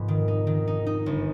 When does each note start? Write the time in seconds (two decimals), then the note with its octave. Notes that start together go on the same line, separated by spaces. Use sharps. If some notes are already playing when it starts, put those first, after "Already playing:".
Already playing: F1 G#2 B3
0.08 D#3
0.28 D#4
0.47 D#3
0.67 D#4
0.86 D#4
1.06 G1